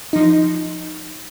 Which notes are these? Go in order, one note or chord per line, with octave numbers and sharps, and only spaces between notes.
F3 D#4